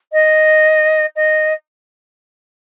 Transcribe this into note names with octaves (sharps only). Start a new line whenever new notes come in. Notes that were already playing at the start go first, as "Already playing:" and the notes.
D#5
D#5